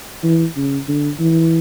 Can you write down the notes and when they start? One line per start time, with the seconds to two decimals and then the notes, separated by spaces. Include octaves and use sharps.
0.23 E3
0.56 C#3
0.88 D3
1.19 E3